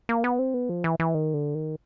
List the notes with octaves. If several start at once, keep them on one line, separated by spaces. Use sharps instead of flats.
A#3
B3
C4
B3
F3
E3
E3
D#3
D3
D#3